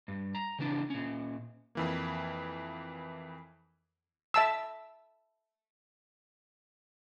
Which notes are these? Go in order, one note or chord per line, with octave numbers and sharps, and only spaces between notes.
G2
A#5
C#3 E3 B3 D4
A#2 C#4
F2 E3 A#3
E5 A5 E6